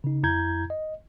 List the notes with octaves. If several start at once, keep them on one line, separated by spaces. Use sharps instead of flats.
C#3 D#4
F2 E4 A#5 G6 G#6
D#5